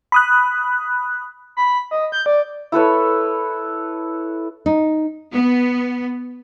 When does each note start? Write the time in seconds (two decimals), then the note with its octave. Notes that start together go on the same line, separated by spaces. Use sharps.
0.12 B5 D#6 F#6
1.57 B5
1.91 D#5
2.12 G6
2.26 D5
2.72 E4 A4 B4 C#5
4.66 D#4
5.33 B3